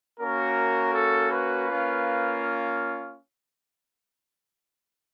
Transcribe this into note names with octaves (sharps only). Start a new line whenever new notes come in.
A#3 C#4 F#4 A#4
A4
B4
A#3 C#4 F4